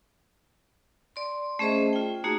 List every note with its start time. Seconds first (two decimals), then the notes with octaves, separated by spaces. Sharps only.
1.16 D5 C6
1.59 A3 C#4 G#4 C5 D#5 E5
1.93 F4 G5
2.24 A3 A#3 D#4 F#4 G#4